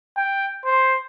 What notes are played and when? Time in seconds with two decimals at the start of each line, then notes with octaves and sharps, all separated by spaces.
0.17 G5
0.65 C5